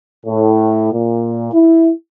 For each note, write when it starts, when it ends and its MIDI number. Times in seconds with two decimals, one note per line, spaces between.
0.24 0.91 45
0.92 1.49 46
1.53 1.90 64